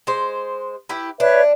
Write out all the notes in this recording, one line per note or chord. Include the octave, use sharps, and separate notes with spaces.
G#3 C5
E4 G4 B4
D4 B4 C#5 E5